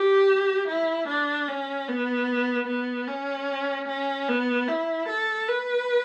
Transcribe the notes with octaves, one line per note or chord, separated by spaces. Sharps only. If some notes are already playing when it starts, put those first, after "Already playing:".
Already playing: G4
E4
D4
C#4
B3
B3
C#4
C#4
B3
E4
A4
B4